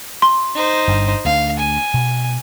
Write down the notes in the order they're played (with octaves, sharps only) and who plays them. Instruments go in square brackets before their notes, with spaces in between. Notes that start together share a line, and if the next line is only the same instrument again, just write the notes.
[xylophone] C6
[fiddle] D#4 C5
[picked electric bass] G1 G2
[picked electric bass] D2 A3 [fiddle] F5
[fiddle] G#5
[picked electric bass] B2